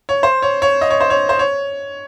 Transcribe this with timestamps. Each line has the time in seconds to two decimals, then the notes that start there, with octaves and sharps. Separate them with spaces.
0.09 C#5
0.23 C5
0.42 C#5
0.62 C#5
0.81 D#5
0.90 C#5
1.00 C5
1.10 C#5
1.29 C5
1.39 C#5